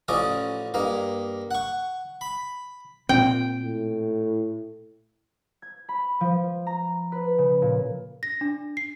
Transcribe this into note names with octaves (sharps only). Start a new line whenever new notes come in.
A1 F3 C#4 D5 D#5 D#6
G2 A#3 D#5
F#5 C#6
B5
A#2 C4 G5
A2
G#6
B5
F3
A#5
B4
C#3
A#2
A#6
D4
C7